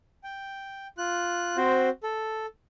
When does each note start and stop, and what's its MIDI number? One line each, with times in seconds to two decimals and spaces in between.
0.24 0.87 79
0.98 1.57 65
0.98 1.57 90
1.57 1.89 60
1.57 1.89 66
1.57 1.89 72
2.03 2.46 69